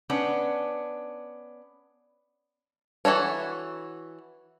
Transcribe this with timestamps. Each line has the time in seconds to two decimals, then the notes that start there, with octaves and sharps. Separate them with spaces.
0.10 B3 C#4 D4
3.05 E3 F#4 A4 C#5